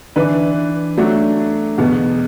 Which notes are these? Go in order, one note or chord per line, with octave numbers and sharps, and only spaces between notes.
E3 D4 B4
F#3 A3 D4 F#4
E2 B2 B3